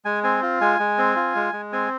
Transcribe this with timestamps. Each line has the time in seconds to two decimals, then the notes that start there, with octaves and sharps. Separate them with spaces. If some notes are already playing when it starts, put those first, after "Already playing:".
0.05 G#3 G#5
0.24 C4 G#5
0.43 F4
0.61 G#3 G#5
0.79 G#3
0.98 C4
1.16 F4
1.35 G#3
1.53 G#3
1.72 C4 G#5